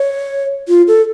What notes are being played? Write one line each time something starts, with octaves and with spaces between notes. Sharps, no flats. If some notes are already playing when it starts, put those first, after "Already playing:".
Already playing: C#5
F4
A4